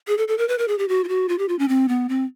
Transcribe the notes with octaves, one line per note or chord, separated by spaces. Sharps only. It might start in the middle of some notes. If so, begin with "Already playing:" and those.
G#4
A4
A4
A#4
B4
A#4
G#4
G4
F#4
F4
F#4
F4
G4
F4
C#4
C4
B3
C4